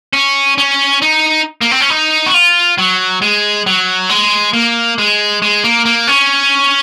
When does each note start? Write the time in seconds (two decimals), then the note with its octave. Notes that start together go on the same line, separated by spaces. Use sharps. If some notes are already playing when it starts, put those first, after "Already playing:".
0.13 C#4
0.58 C#4
1.02 D#4
1.61 A#3
1.71 C4
1.80 C#4
1.90 D#4
2.26 F#4
2.34 F4
2.78 F#3
3.22 G#3
3.67 F#3
4.09 G#3
4.53 A#3
4.98 G#3
5.42 G#3
5.64 A#3
5.85 A#3
6.07 C#4